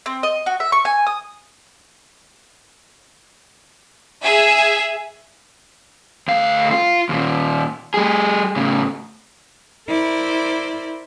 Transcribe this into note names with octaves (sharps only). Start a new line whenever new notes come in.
C4
D#5
F#4
E5
C#6
G#5
D#6
G#4 E5 G#5
D2 F5
F4
D#2 A#2
G3 G#4
A2 C#3
E4 A#4 C5 D5